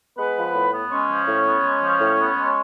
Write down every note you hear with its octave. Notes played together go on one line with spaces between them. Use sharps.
G#3 B3 B4
F3
A2
B3
G#3 C#4 C#5
F3
A2
B3
G#3
F3
A2
B3
G#3